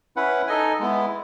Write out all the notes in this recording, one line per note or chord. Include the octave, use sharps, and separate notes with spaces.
C#4 E4 B4 F#5
D#4 A4 D#5 G#5
G#3 B3 E4